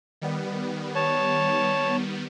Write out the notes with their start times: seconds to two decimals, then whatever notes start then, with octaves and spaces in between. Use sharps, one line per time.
0.21 D#3 G3 B3
0.95 C#5 A5